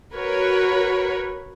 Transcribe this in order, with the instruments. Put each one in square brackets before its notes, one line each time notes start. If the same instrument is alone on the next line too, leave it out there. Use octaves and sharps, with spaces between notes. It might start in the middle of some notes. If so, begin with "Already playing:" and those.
[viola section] F#4 A#4 B4 C#5